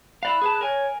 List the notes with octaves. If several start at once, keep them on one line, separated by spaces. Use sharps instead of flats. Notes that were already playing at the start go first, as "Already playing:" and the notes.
E4 D5 F5 B5 F#6
G#4 B4 A5
A#4 C#5 G#5